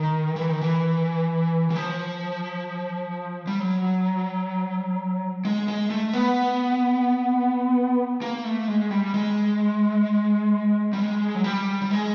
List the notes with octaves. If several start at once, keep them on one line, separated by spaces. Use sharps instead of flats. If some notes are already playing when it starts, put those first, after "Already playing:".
Already playing: D#3
E3
D#3
E3
E3
F3
G3
F#3
G#3
G#3
A3
B3
A#3
A3
G#3
G3
G#3
G3
G#3
F#3
G3
G3
G#3